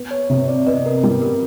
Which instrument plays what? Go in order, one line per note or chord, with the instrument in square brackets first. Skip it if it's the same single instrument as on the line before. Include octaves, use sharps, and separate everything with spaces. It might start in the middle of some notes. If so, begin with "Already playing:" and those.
Already playing: [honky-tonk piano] B3
[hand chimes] C#5
[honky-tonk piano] C3
[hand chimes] D5
[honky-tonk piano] B3 [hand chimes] D#5
[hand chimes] A#4
[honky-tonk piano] G3 [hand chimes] A#4
[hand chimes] A#4